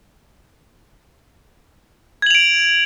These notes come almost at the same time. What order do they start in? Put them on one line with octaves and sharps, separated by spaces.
G#6 F#7 F7 D7